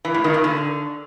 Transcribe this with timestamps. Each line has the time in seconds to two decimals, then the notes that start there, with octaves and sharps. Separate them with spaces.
0.05 E3
0.14 A2
0.24 D#3
0.34 A#2
0.44 D3